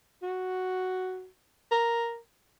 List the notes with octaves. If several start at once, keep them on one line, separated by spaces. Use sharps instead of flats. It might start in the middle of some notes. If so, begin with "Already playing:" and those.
F#4
A#4